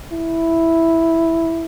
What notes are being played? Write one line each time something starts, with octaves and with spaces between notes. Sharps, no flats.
E4